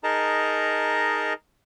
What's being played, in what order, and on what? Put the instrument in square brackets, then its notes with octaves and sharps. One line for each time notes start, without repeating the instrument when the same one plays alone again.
[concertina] D#4 G#4 A#4 D#5 A5 A#5